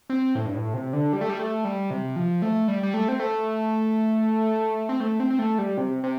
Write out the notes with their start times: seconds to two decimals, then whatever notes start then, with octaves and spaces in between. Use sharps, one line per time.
0.10 C4
0.35 A2
0.46 G2
0.55 A2
0.74 C3
0.93 D3
1.13 G3
1.21 A3
1.29 G3
1.39 A3
1.65 G3
1.91 C3
2.16 F3
2.42 A3
2.68 G3
2.83 G3
2.94 A3
3.08 C4
3.20 A3
4.89 C4
5.00 A3
5.20 C4
5.30 C4
5.39 A3
5.58 G3
5.78 C3
6.03 C3